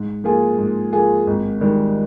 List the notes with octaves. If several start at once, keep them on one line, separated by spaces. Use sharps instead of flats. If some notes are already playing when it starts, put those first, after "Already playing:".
Already playing: G#2
F3 A#3 F4 G#4
G#2
F3 A#3 F4 G#4
G#1
G#2 D#3 G3